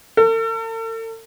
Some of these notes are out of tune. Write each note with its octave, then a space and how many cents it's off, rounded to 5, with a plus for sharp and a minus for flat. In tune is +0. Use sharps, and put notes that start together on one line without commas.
A4 +45